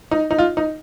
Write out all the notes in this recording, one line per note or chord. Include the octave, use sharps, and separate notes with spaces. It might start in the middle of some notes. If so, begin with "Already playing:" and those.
D#4
D#4
F4
D#4